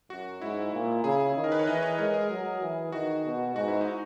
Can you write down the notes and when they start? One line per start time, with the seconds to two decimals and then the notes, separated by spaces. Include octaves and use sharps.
0.10 F#2 F#4
0.41 G#2 E4
0.73 A#2
1.04 C#3 G#4
1.36 D#3
1.44 A#4
1.52 B4
1.59 C#5
1.66 E3 D#5
1.82 C#5
1.98 G#3 A#4
2.14 G#4
2.30 F#3
2.61 E3
2.92 D#3 F#4
3.25 B2
3.55 G#2 F#4
3.68 E4
3.81 D#4